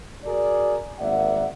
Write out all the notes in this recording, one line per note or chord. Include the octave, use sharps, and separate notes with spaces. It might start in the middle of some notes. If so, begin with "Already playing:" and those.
F#4 G#4 A#4 D5
G#1 A#3 D5 E5 F#5